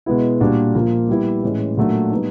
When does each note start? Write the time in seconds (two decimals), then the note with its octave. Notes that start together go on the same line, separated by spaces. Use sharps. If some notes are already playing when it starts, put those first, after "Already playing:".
0.06 B2 G#3 B3 E4
0.40 A#2 G3 A#3 D4 F#4
0.75 A#2 F3 A#3
1.09 G3 B3 E4
1.43 A2 E3 G#3 C#4
1.77 A#2 F#3 A3 D4
2.11 G3 B3 D#4